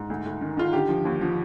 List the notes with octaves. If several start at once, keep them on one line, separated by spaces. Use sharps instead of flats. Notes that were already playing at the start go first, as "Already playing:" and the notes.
Already playing: G#2
D2
D2
D#3
D#3 F4
D3 G4
F3
D#2
F3